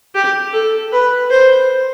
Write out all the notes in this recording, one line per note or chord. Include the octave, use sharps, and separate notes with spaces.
G4
A4
B4
C5